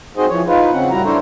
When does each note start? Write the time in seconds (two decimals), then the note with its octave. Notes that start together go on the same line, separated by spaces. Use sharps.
0.17 C4 D#4 F#4 G#4 C5 D#5
0.30 E3 F3 C#5
0.47 D#4 F4 B4
0.72 C#3 C4 C#4 F#5
0.91 A2 G3 E4 F#4 A#4 A#5
1.04 D4 E4 A4 A#4 C5 C#5